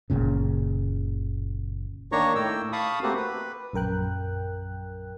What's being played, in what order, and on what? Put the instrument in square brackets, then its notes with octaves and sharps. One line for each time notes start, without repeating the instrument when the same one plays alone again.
[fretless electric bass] F#1 C2 A#2 C#3
[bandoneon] D#3 A#3 D4 C#5 A#5 C#6
A2 G5 E6
F5 A5 B5 C#6 D#6
A3 A#3 C4 F#4 G4
B4
[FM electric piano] A#1 F#2 A#4 G5 F#6